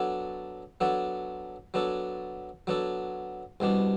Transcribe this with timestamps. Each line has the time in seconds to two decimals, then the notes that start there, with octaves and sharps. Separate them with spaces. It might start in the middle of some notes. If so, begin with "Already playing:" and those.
Already playing: F#3 B3 D4 A4
0.81 F#3 B3 D4 A4
1.74 F#3 B3 D4 A4
2.67 F#3 B3 D4 A4
3.60 C2 B2 G3 D4